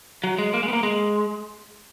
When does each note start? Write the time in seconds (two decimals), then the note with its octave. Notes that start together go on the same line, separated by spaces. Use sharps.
0.24 F#3
0.39 G#3
0.54 A#3
0.63 G#3
0.68 B3
0.73 A#3
0.83 G#3